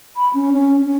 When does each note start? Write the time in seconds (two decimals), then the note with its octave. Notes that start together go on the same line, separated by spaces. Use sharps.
0.16 B5
0.34 C#4
0.53 C#4
0.86 C#4